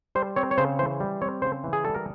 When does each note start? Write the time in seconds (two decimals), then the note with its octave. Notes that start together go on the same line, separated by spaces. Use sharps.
0.15 G3 C5
0.36 C4 C#5
0.51 C#5
0.58 C#3 C5
0.79 E3 C5
1.00 G3
1.22 C4 C#5
1.42 C#3 C5
1.64 E3
1.73 G#4
1.85 G3 A4
1.95 A#4